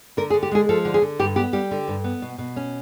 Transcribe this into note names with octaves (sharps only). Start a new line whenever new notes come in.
D3 A#4
G#4
D3
G4
G#3 G#4
F3 A4
D3
G#4
D3
G2 G4
B3 G4
G3 G4
D3
G2
B3
B2
B2
C#4